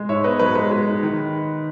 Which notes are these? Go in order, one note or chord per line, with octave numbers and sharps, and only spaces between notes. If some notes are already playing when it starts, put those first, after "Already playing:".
Already playing: G#3
G#2 C#5 E5
B3 B4 D#5
F#3 B4
G#3 B4
G#3
D#4
D#3